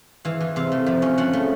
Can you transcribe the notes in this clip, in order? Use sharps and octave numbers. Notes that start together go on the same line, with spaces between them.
E3 F5
E3
C3 F5
A3
F3
C#4
F3 F#5
A3